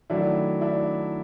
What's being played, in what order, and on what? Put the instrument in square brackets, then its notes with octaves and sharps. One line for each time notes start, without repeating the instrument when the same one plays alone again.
[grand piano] D#3 F#3 A3 [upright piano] D4 E4
[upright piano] D4 E4